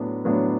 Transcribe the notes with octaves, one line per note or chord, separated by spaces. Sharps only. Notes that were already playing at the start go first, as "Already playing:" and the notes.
Already playing: A2 F#3 B3 D4
A2 F#3 B3 D4